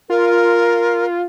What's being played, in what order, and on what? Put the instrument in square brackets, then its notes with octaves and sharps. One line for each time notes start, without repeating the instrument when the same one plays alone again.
[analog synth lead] F4 [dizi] A#4